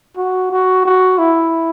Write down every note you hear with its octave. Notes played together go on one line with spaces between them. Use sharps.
F#4
F#4
F#4
E4